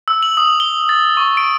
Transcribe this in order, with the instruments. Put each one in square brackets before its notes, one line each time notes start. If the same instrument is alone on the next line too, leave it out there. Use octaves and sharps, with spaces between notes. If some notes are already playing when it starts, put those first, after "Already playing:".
[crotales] E6
F#7
D#6
G7
A6
C#6
D7